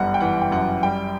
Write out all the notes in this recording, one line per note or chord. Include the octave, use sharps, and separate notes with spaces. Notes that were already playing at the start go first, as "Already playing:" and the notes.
Already playing: G1 F#2 E3 G3 F#5
G5
E3 F#5
G5
F#2 F#5
G3 G5